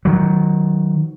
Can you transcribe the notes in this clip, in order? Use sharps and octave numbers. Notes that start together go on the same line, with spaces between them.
D#3 F#3